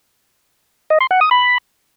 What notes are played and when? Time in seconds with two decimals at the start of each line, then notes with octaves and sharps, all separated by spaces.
0.90 D#5
1.00 C6
1.11 F#5
1.21 D#6
1.31 B5